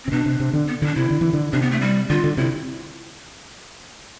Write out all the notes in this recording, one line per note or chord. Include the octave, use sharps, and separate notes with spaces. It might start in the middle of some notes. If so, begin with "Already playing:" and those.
C4
C3
B2 D4
C3
C3
D3
B3
D3 D4 E4
C3 E4
D3
E3
D3
C3 D4
B3
A3
G3
D3 F4
D3
C3 E4